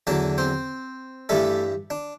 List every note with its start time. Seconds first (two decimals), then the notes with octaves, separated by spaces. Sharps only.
0.07 E2 D3 F#3 D4 D5
0.38 C4 C5
1.29 G2 E3 G3 A3 A4
1.90 D4